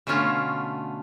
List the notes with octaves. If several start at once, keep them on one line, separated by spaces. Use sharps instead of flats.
B2 D3 A3 C#4 F4